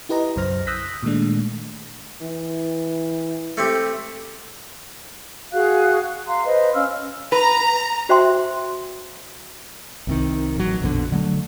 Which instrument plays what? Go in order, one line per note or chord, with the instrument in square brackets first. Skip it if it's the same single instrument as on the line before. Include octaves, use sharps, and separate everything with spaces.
[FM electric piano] E4 G4 B4 D#5 A#5
B1 F#2 C#3 C5 F6 A#6
D#6 E6 F#6 G6 A#6 B6
A#2 D#3 G#3 A3 D4
[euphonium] E3
[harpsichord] A3 C4 G4
[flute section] F#4 G#4 F5 F#6
F5 A#5 C6
B4 C5 D#5
C#4 F5 E6 F6
[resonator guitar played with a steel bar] B4 [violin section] A#5
[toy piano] F#4 C5 E5 G5 C6
[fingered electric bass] C2 C3 D#3
A1 F#3
A#1 F2 B2 D3
D3 F#3 A3